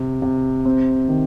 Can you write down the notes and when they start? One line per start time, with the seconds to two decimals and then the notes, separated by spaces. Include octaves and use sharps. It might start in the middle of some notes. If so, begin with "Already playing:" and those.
Already playing: C3
0.22 C3
0.65 C4
1.08 D#3